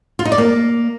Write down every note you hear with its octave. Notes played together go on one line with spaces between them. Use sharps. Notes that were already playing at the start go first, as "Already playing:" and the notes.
F4
D#4
D5
A#3